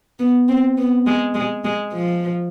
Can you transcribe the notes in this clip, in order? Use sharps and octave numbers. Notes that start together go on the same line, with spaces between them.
B3
C4
B3
G#3
G#3
G#3
F3